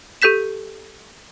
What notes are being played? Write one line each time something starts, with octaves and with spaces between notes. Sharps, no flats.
G4 A4 G6 B6 E7